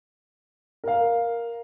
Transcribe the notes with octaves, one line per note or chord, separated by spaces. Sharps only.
A#4 F5